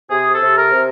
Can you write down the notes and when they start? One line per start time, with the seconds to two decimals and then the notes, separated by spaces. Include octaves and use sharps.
0.10 C3 G#4
0.34 A4
0.41 C3
0.57 A#4
0.72 C3